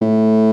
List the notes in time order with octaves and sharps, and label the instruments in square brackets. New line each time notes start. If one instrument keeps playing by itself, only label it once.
[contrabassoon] A2